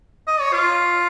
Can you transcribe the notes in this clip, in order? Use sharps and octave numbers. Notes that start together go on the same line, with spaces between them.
D#5
C#5
F4